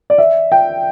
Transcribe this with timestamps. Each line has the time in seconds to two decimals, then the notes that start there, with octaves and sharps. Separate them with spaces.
0.10 D5
0.18 E5
0.52 G5